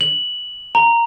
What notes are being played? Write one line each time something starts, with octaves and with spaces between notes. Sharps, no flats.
F#7
A#5